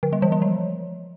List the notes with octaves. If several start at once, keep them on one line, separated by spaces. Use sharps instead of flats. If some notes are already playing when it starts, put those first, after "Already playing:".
D3
G3
E3
G3
F3